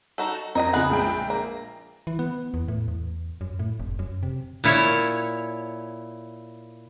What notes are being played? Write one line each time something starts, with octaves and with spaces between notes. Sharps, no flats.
D#4 F#4 A4
F2 A#4 D#5 A#5
F2 C#3 F3 B3 G#4 F#5
A#1 G#3 G5
A#3
E3
B3
E2
A2
E2
F#2
A2
F1
F#2
C3
A#2 E4 C#5